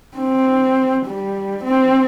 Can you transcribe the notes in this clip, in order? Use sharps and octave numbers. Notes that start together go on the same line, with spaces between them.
C4
G3
C4